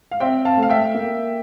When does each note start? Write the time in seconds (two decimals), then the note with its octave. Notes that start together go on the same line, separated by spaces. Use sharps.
0.11 F5
0.20 C4 E5 G5
0.45 F5 A5
0.57 A3
0.63 F5
0.69 E5 G5
0.94 A#3